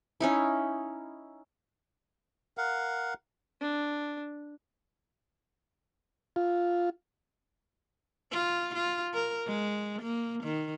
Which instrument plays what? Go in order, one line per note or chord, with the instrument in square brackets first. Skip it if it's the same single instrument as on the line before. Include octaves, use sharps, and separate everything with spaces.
[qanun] C#4 D#4 E4
[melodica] A#4 F5 F#5
[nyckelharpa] D4
[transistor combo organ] F4
[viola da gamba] F4
F4
A#4
G#3
A#3
D#3